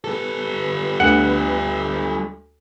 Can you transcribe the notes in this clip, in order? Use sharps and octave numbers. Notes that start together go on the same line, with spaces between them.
G3 A4 B4
D2 F#5